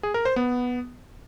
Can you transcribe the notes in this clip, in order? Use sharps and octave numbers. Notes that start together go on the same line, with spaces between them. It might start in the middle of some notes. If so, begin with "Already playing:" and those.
G#4
A#4
C5
B3